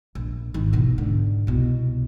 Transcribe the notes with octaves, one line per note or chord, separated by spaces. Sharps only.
A#1
G#1 D#3
B2 E3
G#2 D3
C2 B2